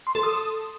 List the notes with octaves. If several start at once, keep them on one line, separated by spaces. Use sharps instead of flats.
C6
A4
D#6